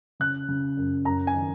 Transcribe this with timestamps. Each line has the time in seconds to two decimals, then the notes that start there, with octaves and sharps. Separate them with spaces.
0.20 C#3 F#6
0.48 C#3
0.77 F#2
1.05 F#2 A#5
1.27 G#5
1.34 D#3